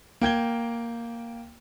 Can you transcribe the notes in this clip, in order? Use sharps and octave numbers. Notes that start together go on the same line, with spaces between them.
A#3 G5 G#6 G7